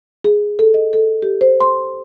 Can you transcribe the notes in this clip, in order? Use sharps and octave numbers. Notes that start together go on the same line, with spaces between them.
G#4
A4
D#5
A4
G4
C5
C6